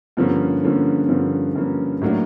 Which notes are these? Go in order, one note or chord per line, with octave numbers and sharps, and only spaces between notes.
G2 D3 F3 A#3 C#4
G2 D3 F3 A#3 C#4
G2 D3 F3 A#3 C#4
G2 D3 F3 A#3 C#4
A2 F#3 A#3 D4